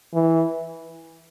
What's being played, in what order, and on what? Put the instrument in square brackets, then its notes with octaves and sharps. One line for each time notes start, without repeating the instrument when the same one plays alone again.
[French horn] E3